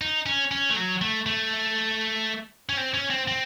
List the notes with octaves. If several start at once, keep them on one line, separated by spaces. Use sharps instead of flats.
D#4
C#4
C#4
A3
F#3
A3
A3
C#4
C4
C#4
C4
C4